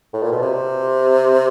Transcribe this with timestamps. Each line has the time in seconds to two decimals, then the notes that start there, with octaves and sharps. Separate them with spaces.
0.14 A2
0.23 A#2
0.32 B2
0.42 C3